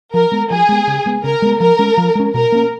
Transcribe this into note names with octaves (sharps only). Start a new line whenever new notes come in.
F3 A#4
G#3 B3
F3 G#4
G#3 B3
C#3
G#3 B3
C#3 A#4
G#3 B3
F3 A#4
G#3 C#4
F3
G#3 C#4
B2 A#4
A#3 C#4